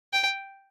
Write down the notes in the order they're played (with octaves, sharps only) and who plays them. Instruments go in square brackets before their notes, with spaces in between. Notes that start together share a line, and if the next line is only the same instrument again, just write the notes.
[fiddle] G5